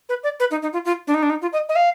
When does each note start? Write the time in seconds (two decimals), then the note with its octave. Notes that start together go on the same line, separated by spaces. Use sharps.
0.09 B4
0.24 D5
0.40 B4
0.51 D#4
0.62 D#4
0.73 F4
0.85 F4
1.07 D4
1.14 D#4
1.23 D4
1.30 D#4
1.42 F4
1.53 D#5
1.69 D#5
1.76 F5